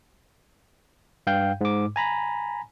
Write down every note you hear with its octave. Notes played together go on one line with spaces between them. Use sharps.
G2 F5 G5 G6
G#2 D6
G#5 A#5 B5